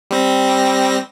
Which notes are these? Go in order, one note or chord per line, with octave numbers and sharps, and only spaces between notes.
G3 C4 A#6